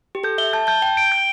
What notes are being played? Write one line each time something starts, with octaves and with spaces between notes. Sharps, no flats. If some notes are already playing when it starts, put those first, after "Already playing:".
G4
A4 G6
E5 G7
A5 G6
A5 G6
G5 G7
D7
G6